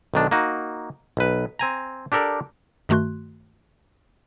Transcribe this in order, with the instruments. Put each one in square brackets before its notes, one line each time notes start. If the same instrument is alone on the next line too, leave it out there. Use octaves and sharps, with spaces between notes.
[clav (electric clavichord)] B1 D#3 D4
A#3 D#4 F#4
B1 B4
C4 G#5 A#5
D4 G4 A4 A#4 D5
[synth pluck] G2 D#3 A3 F#4 C6 F#6